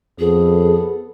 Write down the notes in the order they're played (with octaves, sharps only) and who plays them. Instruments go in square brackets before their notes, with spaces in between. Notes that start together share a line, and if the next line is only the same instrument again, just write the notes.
[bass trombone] F2 [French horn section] B3 A4 [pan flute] G#4